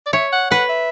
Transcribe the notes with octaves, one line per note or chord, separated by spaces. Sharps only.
D5
C#5 E5
F#5
B4 F#5
E5